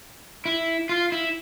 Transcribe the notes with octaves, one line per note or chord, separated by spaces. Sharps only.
E4
F4
E4